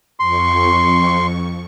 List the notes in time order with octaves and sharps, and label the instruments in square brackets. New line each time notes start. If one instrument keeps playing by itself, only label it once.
[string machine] F2 C#6 [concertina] C6